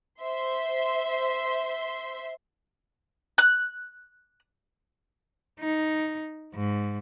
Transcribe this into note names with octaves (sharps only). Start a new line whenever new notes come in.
C5 E5 C6
F#6
D#4
G#2